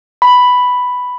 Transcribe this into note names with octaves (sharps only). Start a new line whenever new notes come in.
B5